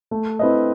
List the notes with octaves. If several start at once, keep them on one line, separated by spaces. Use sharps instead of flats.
A3
C4 E4 B4 D#5